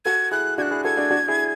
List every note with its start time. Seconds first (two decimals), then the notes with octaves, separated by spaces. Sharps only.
0.05 F#4 A4 G#6
0.31 E4 G#4 F#6
0.58 D4 F#4 G#6
0.62 F#6
0.71 E4 G#4
0.84 F#4 A4 G#6
0.97 D4 F#4
1.11 D4 F#4
1.28 E4 G#4